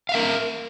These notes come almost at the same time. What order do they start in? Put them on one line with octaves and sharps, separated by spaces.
F5 E5 A#4